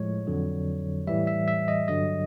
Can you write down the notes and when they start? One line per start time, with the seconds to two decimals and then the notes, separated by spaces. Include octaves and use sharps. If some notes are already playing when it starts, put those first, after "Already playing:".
Already playing: A2 F3 G#3 C#5
0.27 F2 D3 F#3
1.07 A2 E3 G3 E5
1.27 E5
1.48 E5
1.68 D#5
1.88 G2 D3 F#3 D#5